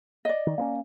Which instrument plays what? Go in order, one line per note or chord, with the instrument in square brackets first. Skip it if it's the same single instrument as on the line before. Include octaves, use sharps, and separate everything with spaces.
[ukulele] D5 D#5
[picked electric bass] D#3
A#3 B3 C#4